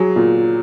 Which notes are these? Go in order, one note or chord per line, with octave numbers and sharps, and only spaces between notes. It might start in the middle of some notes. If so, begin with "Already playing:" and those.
Already playing: F#3 G#4
A#2